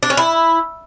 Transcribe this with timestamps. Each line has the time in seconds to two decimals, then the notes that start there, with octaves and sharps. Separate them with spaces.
0.03 D4
0.10 C#4
0.17 E4